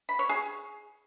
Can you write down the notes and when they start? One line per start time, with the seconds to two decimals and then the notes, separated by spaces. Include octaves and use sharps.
0.09 B5
0.19 C#5
0.29 G#4